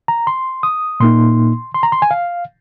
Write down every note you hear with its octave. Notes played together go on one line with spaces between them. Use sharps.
A#5
C6
D#6
A#2 A#3 D#4 C6
C6
A#5
C6
G#5
F5